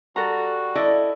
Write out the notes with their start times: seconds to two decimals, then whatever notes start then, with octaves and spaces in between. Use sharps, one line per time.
0.16 G3 F#4 A4 A#5
0.75 E4 A4 D5 D#5